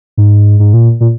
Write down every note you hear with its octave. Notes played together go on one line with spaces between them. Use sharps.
G#2
G#2
A#2
A#2